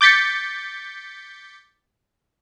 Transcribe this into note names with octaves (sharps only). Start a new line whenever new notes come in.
D6 G6 A6 B6 C#7